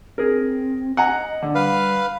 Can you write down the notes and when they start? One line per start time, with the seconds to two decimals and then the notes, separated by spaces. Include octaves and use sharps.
0.18 C4 G#4 A#4
0.97 D#5 F#5 G#5 A#5
1.42 D3
1.55 G3 B4 F5